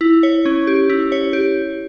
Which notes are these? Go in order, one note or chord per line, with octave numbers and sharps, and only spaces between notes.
E4
C#5
C#4
G4
E4
C#5
G4